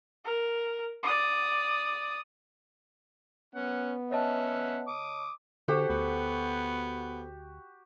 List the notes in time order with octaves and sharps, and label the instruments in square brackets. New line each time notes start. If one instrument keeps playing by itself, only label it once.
[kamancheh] A#4
D5 D#6
[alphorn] B3 [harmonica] C#4 F#5
[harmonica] C#4 E5 F#5 [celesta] C#5 D#5 A5
[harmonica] D6 D#6
[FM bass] D3 [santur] F#4 G4 [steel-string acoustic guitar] A4 C5 F#5
[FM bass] D2 [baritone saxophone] B3